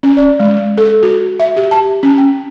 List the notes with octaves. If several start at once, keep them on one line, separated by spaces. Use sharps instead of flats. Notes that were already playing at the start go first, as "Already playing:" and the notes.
C#4
D5
G#3
A4
F#4
E5
G4
A5
C#4
G5